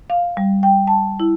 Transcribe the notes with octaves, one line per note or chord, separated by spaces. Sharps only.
F5
G3
G5
A5
E4